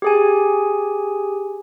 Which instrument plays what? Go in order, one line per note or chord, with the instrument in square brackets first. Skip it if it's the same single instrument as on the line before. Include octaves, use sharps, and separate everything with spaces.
[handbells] G4 G#4 G#5